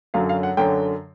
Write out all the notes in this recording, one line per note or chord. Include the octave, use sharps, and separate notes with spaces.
F#2 D3 F#3 F5
F5
F#5
F#2 D3 F#3 G5